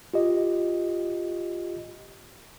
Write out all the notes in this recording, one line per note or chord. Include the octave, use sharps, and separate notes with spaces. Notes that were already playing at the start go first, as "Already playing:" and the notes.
F4 G4 D#5